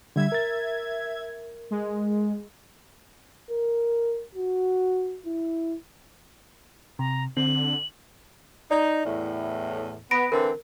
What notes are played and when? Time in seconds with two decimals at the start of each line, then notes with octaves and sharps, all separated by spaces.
0.16 D3 G3 E5 G#6
0.32 A#4 A6
1.71 G#3
3.50 A#4
4.35 F#4
5.26 E4
6.99 C3 A#5
7.37 D3 C4 F#7
8.71 D#4 D5
9.05 E2 A2
10.11 B3 B5 A#6 D7
10.32 D3 E3 C4 A#4